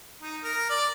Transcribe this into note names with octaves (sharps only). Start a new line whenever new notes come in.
D#4
A#4
D5